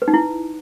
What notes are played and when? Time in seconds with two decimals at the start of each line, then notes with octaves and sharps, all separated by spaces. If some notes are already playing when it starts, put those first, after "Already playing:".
0.02 B4
0.08 D#4
0.14 E4